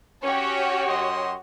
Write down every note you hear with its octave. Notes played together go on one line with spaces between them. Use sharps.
C#4 F#4 G4 C#5
F#2 D#5 C6